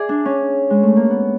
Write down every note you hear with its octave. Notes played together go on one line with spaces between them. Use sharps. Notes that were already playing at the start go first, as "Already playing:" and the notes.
Already playing: G#4 D5 E5
D4
C#4
G#3
A3
A#3
B3